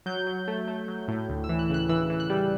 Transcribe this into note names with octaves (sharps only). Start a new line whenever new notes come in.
F#3 G6
F#3
A3
A3
F#3
A2
D2
E6
E3
F#6
C#3 F#6
E3 E6
E3
F#6
G3